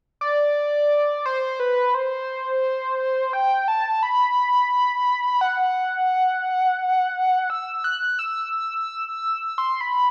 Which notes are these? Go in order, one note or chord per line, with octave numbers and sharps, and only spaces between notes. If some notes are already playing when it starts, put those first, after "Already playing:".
D5
C5
B4
C5
G5
A5
B5
F#5
E6
F#6
E6
C6
B5